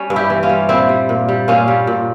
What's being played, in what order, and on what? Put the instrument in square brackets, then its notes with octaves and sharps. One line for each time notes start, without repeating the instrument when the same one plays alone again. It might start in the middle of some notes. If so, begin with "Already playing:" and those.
Already playing: [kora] G3 C#4
G2
E4 G4
E3
C#4 F4
G3
A#2 C4 E4
G3
A#2
G3
A#2 C#4 F4
G3
A#2